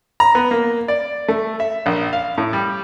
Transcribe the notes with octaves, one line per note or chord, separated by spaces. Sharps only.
A#5
B3
A#3
D5
A3
E5
A#1
F5
A2
G3